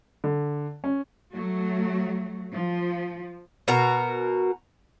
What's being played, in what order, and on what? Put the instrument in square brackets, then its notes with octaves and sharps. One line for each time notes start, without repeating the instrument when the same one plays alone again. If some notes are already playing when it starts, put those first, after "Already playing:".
[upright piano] D3
C#4
[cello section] F#3 A3
F3
[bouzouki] B2 F#4 A#4 A#5